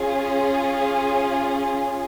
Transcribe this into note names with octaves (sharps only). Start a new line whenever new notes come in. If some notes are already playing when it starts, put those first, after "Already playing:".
Already playing: C#4 F4 G#4